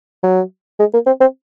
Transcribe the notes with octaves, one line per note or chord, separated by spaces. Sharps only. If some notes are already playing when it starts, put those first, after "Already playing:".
F#3
G#3
A#3
C4
C4